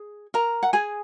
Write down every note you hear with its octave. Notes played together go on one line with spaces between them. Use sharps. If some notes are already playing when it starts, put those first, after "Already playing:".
Already playing: G#4
A#4 A#5
F#5
G#4 G#5